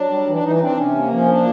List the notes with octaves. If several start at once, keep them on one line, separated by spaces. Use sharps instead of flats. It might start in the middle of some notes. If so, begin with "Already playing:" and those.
Already playing: F#3 D4
G3
E3
D4
E3 D#4
D#4
C4 D4
C3 C#4
A#3
F3 C#4
A#3 D4